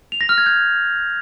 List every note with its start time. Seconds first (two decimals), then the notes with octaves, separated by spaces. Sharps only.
0.12 F7
0.21 A#6
0.29 F6
0.38 G#6
0.46 G6